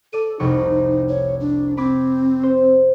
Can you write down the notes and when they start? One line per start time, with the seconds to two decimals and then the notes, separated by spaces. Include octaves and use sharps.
0.13 A4 D5 D#7
0.39 F1 C2 D#4 C#6
1.08 C#5
1.40 D4
1.77 C4 B5 D6 G#6
2.43 C5